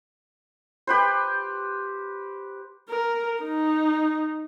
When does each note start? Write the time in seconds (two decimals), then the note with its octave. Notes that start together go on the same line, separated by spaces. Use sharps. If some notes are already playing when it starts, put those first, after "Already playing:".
0.87 G4 B4 C5
2.89 A#4
3.42 D#4